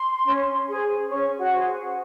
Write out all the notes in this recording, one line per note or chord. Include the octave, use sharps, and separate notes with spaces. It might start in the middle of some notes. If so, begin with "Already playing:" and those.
Already playing: C6
C#4
G#4 C5
C#4 C#5 C#6
F#4 F#5
G#4 C5